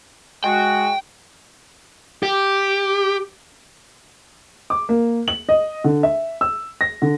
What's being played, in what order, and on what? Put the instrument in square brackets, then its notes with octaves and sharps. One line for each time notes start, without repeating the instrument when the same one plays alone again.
[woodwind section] G#3 F#4 [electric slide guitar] G5
[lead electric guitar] G4
[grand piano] D6
A#3
F#7
D#5
D3
E5
E6
A#6
D3